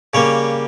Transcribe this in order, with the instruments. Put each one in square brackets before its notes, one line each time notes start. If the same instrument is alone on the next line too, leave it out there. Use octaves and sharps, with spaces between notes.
[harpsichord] C#3 G3 A#3 C#5